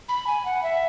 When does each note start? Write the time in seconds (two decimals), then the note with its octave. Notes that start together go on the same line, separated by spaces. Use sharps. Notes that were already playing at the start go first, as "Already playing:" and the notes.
0.09 B5
0.27 G#5
0.45 F#5
0.63 E5